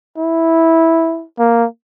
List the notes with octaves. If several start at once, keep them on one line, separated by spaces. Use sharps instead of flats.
E4
A#3